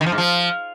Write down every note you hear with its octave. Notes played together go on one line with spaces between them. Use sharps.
D#3
F3
G#2
F3